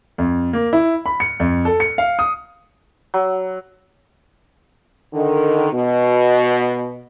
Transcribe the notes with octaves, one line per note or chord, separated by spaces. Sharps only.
F2
A#3
E4
B5
C#7
F2
A4
C#7
F5
D#6
F#3
D3 D#3
B2